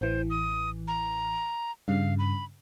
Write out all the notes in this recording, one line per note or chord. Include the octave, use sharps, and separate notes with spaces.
A1 E3 C5
D#6
A#5
G2 C#3 F5
B5